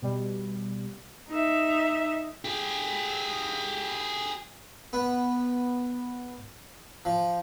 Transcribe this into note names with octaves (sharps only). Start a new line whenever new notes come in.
B2 G3
D#4 E5
G4 G#4
B3
F3